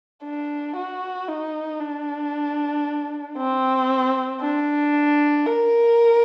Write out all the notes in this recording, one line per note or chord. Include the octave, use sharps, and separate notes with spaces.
D4
F#4
D#4
D4
C4
D4
A#4